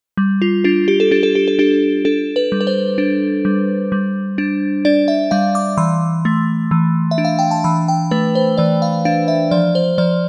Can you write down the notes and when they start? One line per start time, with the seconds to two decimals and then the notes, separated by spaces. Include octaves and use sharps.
0.17 G3
0.42 F4
0.64 D4 F4
0.88 G4
1.00 A4
1.11 D4 G4
1.23 A4
1.35 G4
1.48 A4
1.59 D4 G4
2.05 D4 A4
2.36 B4
2.52 G3
2.61 B4
2.67 C5
2.98 D4
3.45 G3
3.92 G3
4.38 D4
4.85 D4 D5
5.08 E5
5.31 G3 F5
5.55 D6
5.77 E3 C6
6.25 A3
6.71 E3
7.11 E5
7.18 D4
7.25 F5
7.39 G5
7.51 A5
7.64 E3 B5
7.88 G5
8.11 A3 B4
8.35 C5
8.58 E3 D5
8.82 F5
9.05 D4 F5
9.28 E5
9.51 F3 D5
9.75 C5
9.98 F3 D5